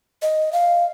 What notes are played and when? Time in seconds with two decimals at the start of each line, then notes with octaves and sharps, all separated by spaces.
0.22 D#5
0.53 F5